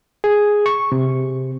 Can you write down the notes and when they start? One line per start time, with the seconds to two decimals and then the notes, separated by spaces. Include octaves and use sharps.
0.24 G#4
0.66 C#6
0.92 C3